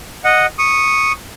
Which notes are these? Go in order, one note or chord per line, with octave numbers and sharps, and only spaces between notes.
D#5 F#5
C#6 D#6